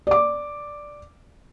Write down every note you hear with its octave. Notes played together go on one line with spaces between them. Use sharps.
D5 D6